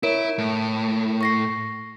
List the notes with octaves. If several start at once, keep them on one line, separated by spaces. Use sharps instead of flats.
E4 A#4 C#5 D7
A2
C#6 A#6 C7